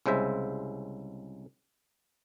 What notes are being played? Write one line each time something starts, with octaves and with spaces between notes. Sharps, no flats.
C2 C#3 G#3 C5 E5